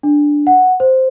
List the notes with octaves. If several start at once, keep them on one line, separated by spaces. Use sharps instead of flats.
D4
F#5
C5